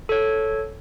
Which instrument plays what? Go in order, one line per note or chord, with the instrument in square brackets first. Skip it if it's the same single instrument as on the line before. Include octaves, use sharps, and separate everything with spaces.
[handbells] A4 C#5